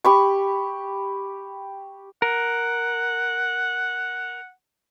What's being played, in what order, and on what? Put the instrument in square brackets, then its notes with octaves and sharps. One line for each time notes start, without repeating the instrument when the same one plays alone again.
[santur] G4 B5 C#6
[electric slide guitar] A#4 [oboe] F#5